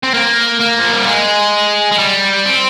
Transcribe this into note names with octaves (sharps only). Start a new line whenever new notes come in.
C4
A#3
A#3
F3
G3
G#3
G#3
G3
C4